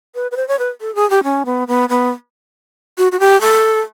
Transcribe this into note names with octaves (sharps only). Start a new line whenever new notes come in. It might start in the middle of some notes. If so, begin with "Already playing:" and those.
B4
B4
C5
C#5
B4
A4
G#4
G4
C#4
B3
B3
B3
F#4
F#4
G4
A4